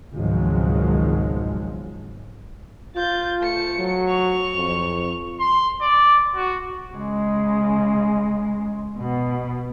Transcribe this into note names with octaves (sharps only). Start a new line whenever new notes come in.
G#1 C#2 B2 F3 F#3 G#3
F4 G6 A6
A3 C#7
F#3
C#6 F7
F2
C6
D5
F#4
C#3 G#3
B2 B3